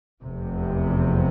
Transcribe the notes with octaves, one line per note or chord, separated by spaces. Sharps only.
F1 E2 C3